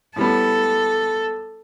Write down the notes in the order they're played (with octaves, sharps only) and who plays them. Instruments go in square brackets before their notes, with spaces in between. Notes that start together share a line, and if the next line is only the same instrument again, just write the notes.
[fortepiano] A2 G3 B3 [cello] A4